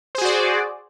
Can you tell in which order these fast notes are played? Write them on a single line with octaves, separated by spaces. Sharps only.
C5 G#4 F#4 D5